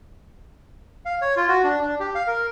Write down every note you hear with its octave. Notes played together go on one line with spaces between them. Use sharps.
F5
C#5
F4
F#4
D4
D4
G4
F5
A#4